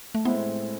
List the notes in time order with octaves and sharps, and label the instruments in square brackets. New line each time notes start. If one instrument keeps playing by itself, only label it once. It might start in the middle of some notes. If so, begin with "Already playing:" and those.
[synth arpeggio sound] A3
[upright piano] A2 G#3 C4 E4 [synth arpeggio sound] B3